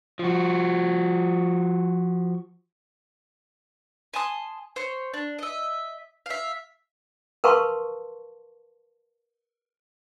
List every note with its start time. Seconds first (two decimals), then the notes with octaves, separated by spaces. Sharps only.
0.19 F3 F#4
4.14 G#5 A5 C6 D#6
4.76 C5 C#5
5.14 D4
5.39 D#5 E5
6.26 E5 F5
7.44 A#4 B4 F5 A5 C6 C#6